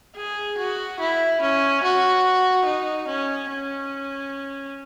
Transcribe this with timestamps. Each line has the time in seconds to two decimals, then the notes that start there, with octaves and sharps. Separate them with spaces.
0.16 G#4
0.58 F#4
1.00 E4
1.42 C#4
1.84 F#4
2.66 D#4
3.08 C#4
3.50 C#4